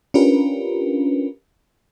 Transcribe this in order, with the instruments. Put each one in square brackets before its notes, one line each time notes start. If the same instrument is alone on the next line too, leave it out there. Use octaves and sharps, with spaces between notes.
[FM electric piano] C#4 D4 F4 G4 A#4 B4